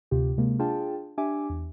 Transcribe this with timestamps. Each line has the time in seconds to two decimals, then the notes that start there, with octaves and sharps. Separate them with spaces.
0.11 D2 C3 F4 G4
0.38 C3 G#3 A#3
0.59 D4 F4 G#4 G5 A5
1.18 D4 G4 E5 G#5 D6
1.50 E2